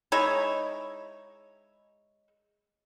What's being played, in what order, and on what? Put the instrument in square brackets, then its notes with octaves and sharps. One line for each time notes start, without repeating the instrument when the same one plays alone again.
[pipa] G#3 D#4 E4 C#5